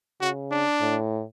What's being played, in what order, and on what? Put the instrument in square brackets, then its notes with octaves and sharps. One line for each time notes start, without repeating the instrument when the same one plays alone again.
[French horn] C#3 [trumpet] F#4
[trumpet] D4
[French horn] A2